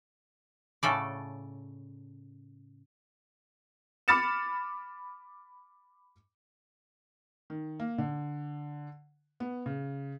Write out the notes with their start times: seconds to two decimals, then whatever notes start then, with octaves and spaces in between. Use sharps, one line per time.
0.83 A2 C#3 A4 D5
4.08 B5 D6 F6 A6 C#7 E7
7.50 D#3
7.80 A#3
7.98 D3
9.40 B3
9.66 C#3